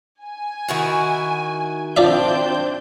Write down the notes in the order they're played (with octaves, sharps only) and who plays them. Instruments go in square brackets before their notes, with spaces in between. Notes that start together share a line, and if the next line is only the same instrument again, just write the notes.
[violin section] G#5
[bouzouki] D#3 E4 F#4
[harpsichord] F3 D5 E5 [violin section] C4 D4 G6